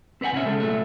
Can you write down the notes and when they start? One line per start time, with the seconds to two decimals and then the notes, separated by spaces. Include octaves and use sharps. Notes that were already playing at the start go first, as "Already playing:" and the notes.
0.21 C4 B4 C#5 F#5 G#5
0.32 B2 D3 B3 C#4 E5
0.45 C#3 G#3 C#4 A4
0.60 C2 A#2 F#3 A3 E5